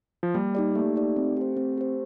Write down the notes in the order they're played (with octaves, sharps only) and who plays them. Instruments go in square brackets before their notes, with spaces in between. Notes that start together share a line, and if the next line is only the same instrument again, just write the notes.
[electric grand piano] F3
[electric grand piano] G3 [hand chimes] A#3
[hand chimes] D#4 G4 D5
[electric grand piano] A3 [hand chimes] A#3
[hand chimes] D#4 G4 D5
C4
G4 C5
C4
G4 C5